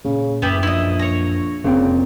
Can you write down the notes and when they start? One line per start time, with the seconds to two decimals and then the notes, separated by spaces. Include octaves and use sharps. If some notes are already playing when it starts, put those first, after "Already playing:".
0.05 A#2 C#3 A#3
0.42 F#1 F#2 B3 E4 G4
0.63 A#1 E4 D#5
0.99 C#5 A#5
1.64 F1 A#2 C#3 C4